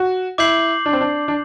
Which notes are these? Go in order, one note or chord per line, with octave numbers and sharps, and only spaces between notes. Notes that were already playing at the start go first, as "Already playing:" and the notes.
Already playing: F#4
E4 D6 G6 C7 F#7
D4
C4
D4
D4